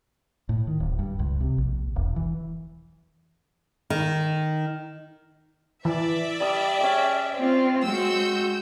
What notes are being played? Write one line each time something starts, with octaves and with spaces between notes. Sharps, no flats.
A2
D#3
D1
G2
C#2
C3
A#1
E1
E3
D#3
E3 D5 E5
G3 A5 D#6
C#4 G#4 G5
C4 F4
G#3 F#4 E6 G6